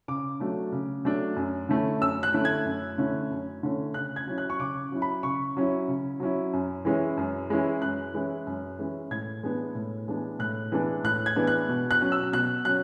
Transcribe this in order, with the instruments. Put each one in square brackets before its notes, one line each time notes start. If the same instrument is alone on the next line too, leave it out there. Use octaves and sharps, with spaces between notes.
[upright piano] C#3 D6
F#3 A3 D4
C#3
F#3 A3 D4
F#2
D3 A3 C#4 E4
F#2 E6
F#6
D3 A3 C#4 E4
G#6
F#2
D3 A3 C#4 E4
F#2
D3 A3 C#4 E4
C#3 F#6
G#6
F#3 C#4 E4
F#6
C#6
C#3 D6
F#3 C#4 E4
B5
C#3 C#6
F#3 C#4 E4
C#3
F#3 C#4 E4
F#2
E3 G#3 C#4 E4
F#2
E3 G#3 C#4 E4
F#2 F#6
E3 G#3 C#4 E4
F#2
E3 G#3 C#4 E4
A2 G#6
E3 G#3 B3 D4
A2
E3 G#3 B3 D4
A2 F#6
E3 G#3 B3 D4
A2 F#6
G#6
E3 G#3 B3 D4
F#6
B2
F#6
F#3 C#4
E6
B2 F#6
F#3 C#4 F#6